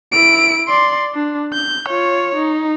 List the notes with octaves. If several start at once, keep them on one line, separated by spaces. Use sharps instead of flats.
E4 D7
D5 C6
D4
G6
F4 C#5
D#4